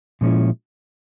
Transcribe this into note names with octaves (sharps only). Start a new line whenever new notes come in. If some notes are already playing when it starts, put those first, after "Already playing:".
A#2 F3 G#3 C#4 E4